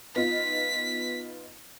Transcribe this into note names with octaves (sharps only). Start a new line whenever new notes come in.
B3 D#4 F4 B6